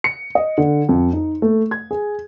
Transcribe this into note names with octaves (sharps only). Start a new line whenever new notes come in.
C#7
D#5
D3
F2
D#4
A3
G#6
G#4